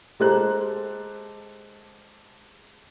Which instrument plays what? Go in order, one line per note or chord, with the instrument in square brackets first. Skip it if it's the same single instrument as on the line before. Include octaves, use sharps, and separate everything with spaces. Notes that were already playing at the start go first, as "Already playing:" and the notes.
[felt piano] G#3 G4 A4 C5 A#5 F#6